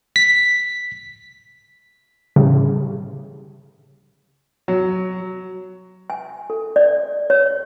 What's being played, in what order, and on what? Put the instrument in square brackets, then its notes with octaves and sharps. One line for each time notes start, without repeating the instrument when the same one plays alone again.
[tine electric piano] B6
[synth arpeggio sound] A2 C#3 G3
[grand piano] F#3
[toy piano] G#5
A4
D5
C#5